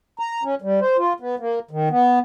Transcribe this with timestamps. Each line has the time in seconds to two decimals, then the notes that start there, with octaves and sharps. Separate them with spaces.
0.19 A#5
0.43 C#4
0.62 G3
0.81 C5
0.98 F4
1.20 B3
1.39 A#3
1.71 D#3
1.90 B3